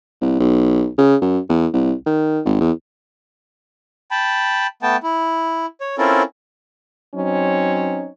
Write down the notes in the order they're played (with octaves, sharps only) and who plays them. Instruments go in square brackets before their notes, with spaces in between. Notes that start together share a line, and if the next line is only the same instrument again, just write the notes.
[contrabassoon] C2
B1
C#3
F#2
E2
C2
D#3
G#1
E2
[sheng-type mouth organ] G5 A5 B5
A3 B3 G5 A5
E4
C#5
C4 C#4 E4 F4 A4 A#4
[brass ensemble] F#3 C4 C#4 D#4 C#5